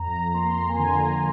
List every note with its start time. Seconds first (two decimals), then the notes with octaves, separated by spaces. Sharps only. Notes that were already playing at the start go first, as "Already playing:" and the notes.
Already playing: F2 A#5
0.34 A#3 C6
0.69 G#5
0.77 D3 A#5